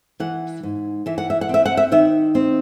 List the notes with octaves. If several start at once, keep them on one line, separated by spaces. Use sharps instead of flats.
E3 F#5
G#2
E3 E5
F#5
E5
F#5
C4 E5
F#5
E5
D#3 E5
C4